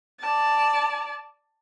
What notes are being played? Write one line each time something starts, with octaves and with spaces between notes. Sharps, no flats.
D5 A5